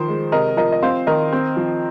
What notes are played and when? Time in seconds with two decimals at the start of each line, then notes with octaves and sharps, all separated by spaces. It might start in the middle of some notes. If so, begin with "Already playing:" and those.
Already playing: D#3 F3 C5
0.08 G#3
0.32 C3 A#4 D#5
0.57 F3 A#4 D#5
0.72 D#5
0.82 C4 C5 F5
1.07 D#3 A#4 D#5
1.33 C4
1.57 F3